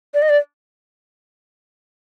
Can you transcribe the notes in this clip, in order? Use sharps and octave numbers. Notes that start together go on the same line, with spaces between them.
D5
D#5
D5